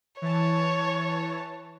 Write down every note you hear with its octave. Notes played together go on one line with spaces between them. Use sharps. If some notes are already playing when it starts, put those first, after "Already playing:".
E3 C#5 A5